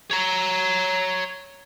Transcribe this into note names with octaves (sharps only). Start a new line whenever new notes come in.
C#5 A#5